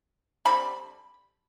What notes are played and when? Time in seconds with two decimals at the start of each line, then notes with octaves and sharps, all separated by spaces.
0.45 D3 G3 C4 B5